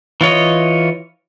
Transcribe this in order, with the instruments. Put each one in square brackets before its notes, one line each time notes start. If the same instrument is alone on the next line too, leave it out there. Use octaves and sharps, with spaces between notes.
[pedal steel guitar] E3 F4 C#5 D#5